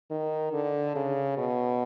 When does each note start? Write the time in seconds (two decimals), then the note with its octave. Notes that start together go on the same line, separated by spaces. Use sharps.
0.11 D#3
0.53 D3
0.95 C#3
1.37 B2